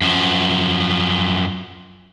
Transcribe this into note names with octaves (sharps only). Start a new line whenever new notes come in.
F#2 F3